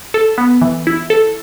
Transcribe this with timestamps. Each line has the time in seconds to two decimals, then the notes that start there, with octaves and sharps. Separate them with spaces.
0.14 A4
0.38 B3
0.62 E3
0.87 E4
1.10 A4